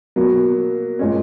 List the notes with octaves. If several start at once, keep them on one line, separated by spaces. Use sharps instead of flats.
B2 F#3 A#3
A#2 G#3 C#4